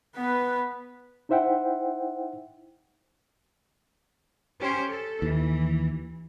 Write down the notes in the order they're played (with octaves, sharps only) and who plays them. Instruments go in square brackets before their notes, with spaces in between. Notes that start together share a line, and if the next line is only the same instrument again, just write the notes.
[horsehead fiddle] B3 B4
[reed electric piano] D#4 E4 C5 E5 F#5 G5
[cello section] C#4 G4 C5
A4
[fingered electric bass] D#2 [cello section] E3